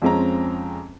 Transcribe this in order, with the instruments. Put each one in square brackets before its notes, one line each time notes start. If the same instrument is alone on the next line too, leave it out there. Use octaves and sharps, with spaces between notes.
[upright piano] F2 F3 G#3 C4 C#4 A#5